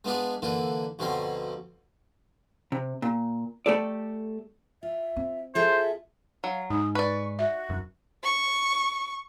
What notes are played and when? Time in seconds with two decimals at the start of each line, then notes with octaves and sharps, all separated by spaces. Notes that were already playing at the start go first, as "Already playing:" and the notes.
0.04 G#3 B3 D4 F4 G#4 D5
0.42 D3 E3 A#3 F4
0.99 D2 B2 F3 C4 F5 A#5
2.72 C3
3.02 A#2
3.66 A3 G4 A4 D5
4.83 F4 E5
5.16 C4
5.55 F4 G#4 A4 C5 E5
6.44 F#3 F5
6.70 G#2 D#4 D#6
6.95 B4 D5 C#6
7.39 F#4 E5
7.69 D#1 F#2
8.23 C#6